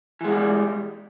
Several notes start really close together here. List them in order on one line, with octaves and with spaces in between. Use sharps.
E3 G#3 B2 G3